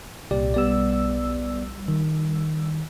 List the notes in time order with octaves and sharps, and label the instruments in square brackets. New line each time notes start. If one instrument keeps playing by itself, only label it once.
[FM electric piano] C2 A#2 [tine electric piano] G4 D5
[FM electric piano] B1 G3 E6 [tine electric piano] B3 D5
[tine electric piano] D#3